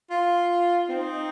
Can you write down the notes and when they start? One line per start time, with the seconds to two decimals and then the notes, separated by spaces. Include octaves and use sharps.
0.10 F4
0.89 C4 D#4